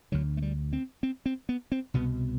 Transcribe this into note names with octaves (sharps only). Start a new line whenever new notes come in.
D2 D3 F#3
A3
G3
C4
C4
C4
B3
C4
C2 B2 B3